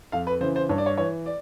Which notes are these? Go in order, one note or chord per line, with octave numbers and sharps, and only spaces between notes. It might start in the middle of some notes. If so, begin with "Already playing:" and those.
F2 F5
B4
C#3 E3 C5
C5
G2 C#5
D5
C#5
E3 C#5
D5